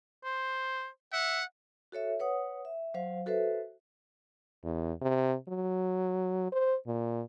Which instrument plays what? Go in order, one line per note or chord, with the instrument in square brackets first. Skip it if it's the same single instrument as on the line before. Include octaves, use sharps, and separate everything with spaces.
[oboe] C5
[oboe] E5 [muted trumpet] F#5
[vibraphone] F#4 A4 C#5 E5
B4 C#5 F#5 D#6
E5
F#3 C5 F5
F#4 A4 B4 C5 E5
[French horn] E2
C3
F#3
C5
A#2